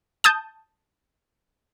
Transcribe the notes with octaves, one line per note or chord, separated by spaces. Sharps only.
A5 D#6 G6